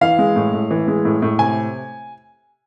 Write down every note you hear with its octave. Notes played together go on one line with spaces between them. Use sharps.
E3 F5
G#3
A2
A2
E3
G#3
A2
A2
C3 G#5